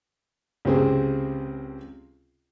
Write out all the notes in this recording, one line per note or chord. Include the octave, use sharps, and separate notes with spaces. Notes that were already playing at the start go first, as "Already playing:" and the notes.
C#2 C3 C4 G#4